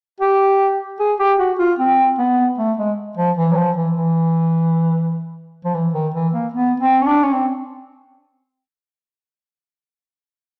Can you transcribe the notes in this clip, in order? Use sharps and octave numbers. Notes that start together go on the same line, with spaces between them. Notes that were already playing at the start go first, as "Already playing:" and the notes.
G4
G#4
G4
F#4
F4
C4
B3
A3
G#3
F3
E3
F#3
F3
E3
E3
F3
E3
D#3
E3
A#3
B3
C4
C#4
D4
C#4
C4